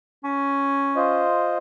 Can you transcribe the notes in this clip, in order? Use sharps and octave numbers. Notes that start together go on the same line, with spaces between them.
C#4
F4 C5 D#5